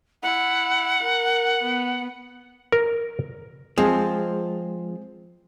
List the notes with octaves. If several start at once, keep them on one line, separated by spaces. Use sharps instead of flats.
E4 F#5
A#4
B3
A#4
F3 G#3 C4 G#4